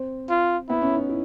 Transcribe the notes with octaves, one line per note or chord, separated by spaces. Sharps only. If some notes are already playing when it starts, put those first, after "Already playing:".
Already playing: C4
F4
B3 E4
C#4
D#4
E4